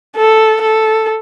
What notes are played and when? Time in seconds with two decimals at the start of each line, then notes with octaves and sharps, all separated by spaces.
0.16 A4
0.61 A4